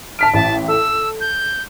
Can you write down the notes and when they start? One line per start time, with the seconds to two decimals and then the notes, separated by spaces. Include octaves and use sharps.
0.19 A5 F6 B6 D7
0.34 A1 A5
0.68 A4 E6
1.21 G6